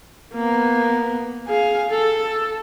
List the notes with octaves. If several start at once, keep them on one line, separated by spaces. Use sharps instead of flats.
A#3 B3
G#4 F5
A4